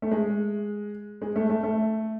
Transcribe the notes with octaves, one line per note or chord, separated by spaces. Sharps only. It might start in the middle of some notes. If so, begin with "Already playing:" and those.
A3
G#3
G#3
A3
A3
A3